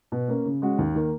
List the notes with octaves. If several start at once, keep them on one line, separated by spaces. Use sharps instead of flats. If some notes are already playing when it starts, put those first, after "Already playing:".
B2
A#3 C#4
C#3
G#3 C#4 F#4
D#2
D#3 A#3